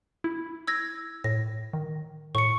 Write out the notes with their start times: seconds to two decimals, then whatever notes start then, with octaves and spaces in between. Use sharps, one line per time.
0.24 E4
0.67 E6 G#6 A#6
1.24 A2 A#6
1.73 D#3
2.35 A2 C#6 C#7